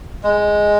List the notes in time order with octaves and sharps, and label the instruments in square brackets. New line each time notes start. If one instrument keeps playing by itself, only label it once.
[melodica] G#3